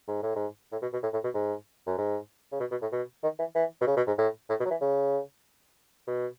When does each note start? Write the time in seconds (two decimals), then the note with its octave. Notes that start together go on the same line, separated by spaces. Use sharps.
0.08 G#2
0.23 A2
0.36 G#2
0.72 A2
0.82 B2
0.93 B2
1.03 A2
1.13 A2
1.24 B2
1.34 G#2
1.87 F#2
1.98 G#2
2.52 C#3
2.60 B2
2.71 B2
2.82 A2
2.92 B2
3.23 D#3
3.39 E3
3.55 E3
3.81 B2
3.87 C#3
3.97 B2
4.07 G#2
4.18 A2
4.49 A2
4.60 B2
4.65 F#3
4.71 E3
4.81 C#3
6.08 B2